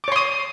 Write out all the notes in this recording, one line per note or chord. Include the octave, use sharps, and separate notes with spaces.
C#5 C6 D6 D#6